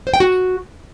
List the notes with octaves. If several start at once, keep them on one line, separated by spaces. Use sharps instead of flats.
C5
G5
F#4